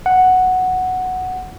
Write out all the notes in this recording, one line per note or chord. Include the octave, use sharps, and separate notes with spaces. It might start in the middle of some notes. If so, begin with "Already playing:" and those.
F#5